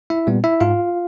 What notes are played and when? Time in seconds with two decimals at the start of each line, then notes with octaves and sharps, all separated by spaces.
0.10 E4 E5
0.27 A#2 G3 B3
0.44 E4 E5
0.60 G#2 F4 F5